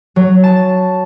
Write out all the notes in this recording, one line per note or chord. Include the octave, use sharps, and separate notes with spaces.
F#3
A5